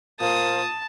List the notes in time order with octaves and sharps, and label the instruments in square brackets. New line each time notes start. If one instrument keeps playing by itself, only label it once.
[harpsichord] A#2 A#3 [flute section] A#4 C5 F5 [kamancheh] A5 [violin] D#6